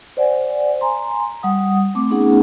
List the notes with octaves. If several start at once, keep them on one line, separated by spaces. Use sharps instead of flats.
C5 D5 F#5 G#5
G#5 A#5 C6
G3 F#5 D#6
A3 C4 D6
A3 B3 C#4 D#4 G#4 F#5